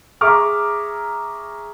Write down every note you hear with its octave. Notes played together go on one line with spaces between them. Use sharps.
G#4 E5 A#5 C#6 D6 F6